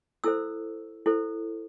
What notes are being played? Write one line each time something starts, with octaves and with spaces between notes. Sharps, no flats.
E4 A4 C5 E6
E4 A4 C5